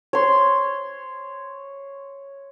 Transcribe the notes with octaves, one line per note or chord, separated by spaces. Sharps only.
C#5 C6